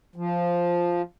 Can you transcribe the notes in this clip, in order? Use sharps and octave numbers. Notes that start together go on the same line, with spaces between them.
F3